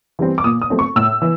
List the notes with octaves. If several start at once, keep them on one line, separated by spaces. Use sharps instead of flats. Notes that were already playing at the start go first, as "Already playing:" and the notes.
E3 G3 C4
D6
A#2 D#6
D#6
F#3 A3 C4
C#6
A2 E6
E3